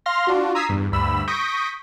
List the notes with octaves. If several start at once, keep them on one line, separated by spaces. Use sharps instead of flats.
F5 C6 F6 A#6
D4 F4 F#4
A#5 D#6 E6 G#6 B6 C7
E2 G2
D2 G2 B5 E6
C#6 D#6 G6 A#6 B6 D7